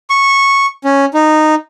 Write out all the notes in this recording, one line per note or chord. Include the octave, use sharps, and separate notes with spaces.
C#6
C#4
D#4